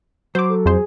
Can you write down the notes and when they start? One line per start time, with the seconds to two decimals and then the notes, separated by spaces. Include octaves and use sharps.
0.35 F#3 C5 D6
0.49 A4
0.66 F2 G#4 C5